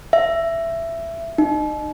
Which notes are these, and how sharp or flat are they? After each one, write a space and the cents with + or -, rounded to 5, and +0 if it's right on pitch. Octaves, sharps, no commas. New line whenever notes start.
E5 +15
D#4 -30